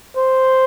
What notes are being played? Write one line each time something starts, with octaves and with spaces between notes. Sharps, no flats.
C5